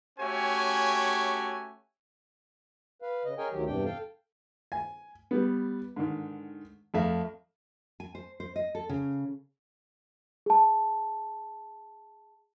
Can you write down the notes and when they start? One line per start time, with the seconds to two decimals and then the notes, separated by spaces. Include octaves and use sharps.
0.19 A3 C#4 F#4 G4 C#5 G#5
3.02 B4 F5
3.25 C#3 D#5
3.38 G#4 A#4 C#5 D#5 G5 G#5
3.52 D2 D#3 F#3 G4
3.66 E2 G2 C3 D4 G5
3.85 A4 F5 G5
4.72 G#5
5.31 G3 B3
5.96 G#2 D3 D#3
6.94 F2 A3 E5 F5
8.00 G#5
8.15 C5
8.40 C5
8.56 D#5
8.75 A4
8.89 C#3
10.46 G#4 A5